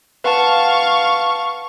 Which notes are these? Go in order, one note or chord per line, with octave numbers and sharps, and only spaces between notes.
B4 F5 F#5 A5 C#6